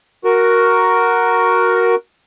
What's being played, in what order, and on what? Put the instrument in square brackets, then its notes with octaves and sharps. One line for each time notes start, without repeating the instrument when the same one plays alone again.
[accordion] F#4 A#4